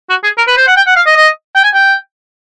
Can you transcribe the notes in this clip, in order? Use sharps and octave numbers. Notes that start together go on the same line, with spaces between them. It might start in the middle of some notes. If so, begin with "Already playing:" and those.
F#4
G#4
A#4
B4
C5
F#5
G5
F#5
F5
D#5
D#5
G5
G#5
G5